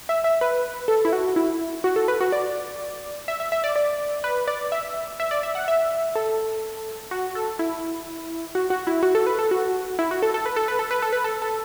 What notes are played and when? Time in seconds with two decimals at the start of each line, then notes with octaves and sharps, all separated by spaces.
0.09 E5
0.24 E5
0.41 B4
0.88 A4
1.05 E4
1.13 F#4
1.36 E4
1.84 F#4
1.96 A4
2.08 B4
2.21 F#4
2.32 D5
3.28 E5
3.40 E5
3.52 E5
3.64 D5
3.76 D5
4.24 B4
4.48 D5
4.72 E5
5.20 E5
5.31 D5
5.43 E5
5.55 F#5
5.68 E5
6.15 A4
7.11 F#4
7.35 A4
7.59 E4
8.55 F#4
8.70 F#4
8.87 E4
9.03 F#4
9.15 A4
9.27 B4
9.39 A4
9.51 F#4
9.99 E4
10.11 F#4
10.22 A4
10.34 A4
10.46 B4
10.56 A4
10.68 B4
10.79 A4
10.91 B4
11.02 A4
11.13 B4
11.24 A4
11.42 A4